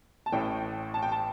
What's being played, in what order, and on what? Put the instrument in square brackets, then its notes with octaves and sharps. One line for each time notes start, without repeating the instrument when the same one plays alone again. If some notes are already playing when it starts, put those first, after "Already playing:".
[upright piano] A5
A1 A2 E3 G5
A5
G5
A5